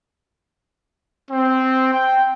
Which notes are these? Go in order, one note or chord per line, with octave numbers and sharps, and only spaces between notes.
C4
G5